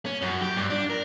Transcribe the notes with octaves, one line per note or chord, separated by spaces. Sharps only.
C#4
F#2
G4
G2
D4
A#4